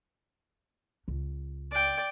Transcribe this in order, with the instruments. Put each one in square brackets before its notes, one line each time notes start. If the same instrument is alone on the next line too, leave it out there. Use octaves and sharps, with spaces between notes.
[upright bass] C#2
[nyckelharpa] D5 G5